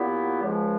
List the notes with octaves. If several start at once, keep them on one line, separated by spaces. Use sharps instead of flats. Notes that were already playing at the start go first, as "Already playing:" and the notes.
Already playing: A#2 F#3 B3 E4 G4
C#2 C#3 F3 G#3